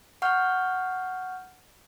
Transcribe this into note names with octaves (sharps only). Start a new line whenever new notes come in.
F#5 C#6 F6 G6